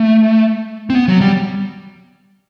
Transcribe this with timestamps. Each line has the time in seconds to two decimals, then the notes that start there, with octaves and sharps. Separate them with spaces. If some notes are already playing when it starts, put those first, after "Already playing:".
Already playing: A3
0.90 C4
0.95 B3
1.08 F#3
1.21 G3